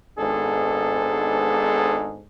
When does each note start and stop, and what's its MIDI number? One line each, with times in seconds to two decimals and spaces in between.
0.18 2.24 32
0.18 2.24 44
0.18 2.24 59
0.18 2.24 62
0.18 2.24 68
0.18 2.24 69